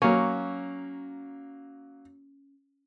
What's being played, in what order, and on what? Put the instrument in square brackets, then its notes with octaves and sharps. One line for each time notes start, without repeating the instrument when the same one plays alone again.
[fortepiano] F#3 A#3 [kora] C#4